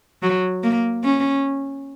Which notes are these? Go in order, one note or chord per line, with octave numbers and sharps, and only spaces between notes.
F#3
A#3
C#4